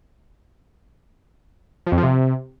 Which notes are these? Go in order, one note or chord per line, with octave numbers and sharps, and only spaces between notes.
F3
F2
F3
C3